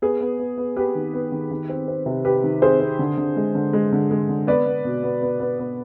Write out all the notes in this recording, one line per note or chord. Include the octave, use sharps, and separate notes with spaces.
B3 G#4
B3
B3
B3
B3 G4 B4
D#3
B3
D#3
D#3
C4
C4
C3
C4 G4 B4
D#3
C4 G#4 C5
C4
D3
D3
G#3
D3
G#3
D3
G#3
D3
B3 B4 D5
B3
B2
B3
B3
B3
B3